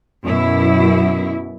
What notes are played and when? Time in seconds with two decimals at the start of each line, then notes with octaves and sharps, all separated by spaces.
0.25 F#2 B2 E4